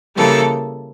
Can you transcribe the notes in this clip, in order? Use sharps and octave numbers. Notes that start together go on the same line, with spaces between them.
C#3 E3 G3 A#3 A4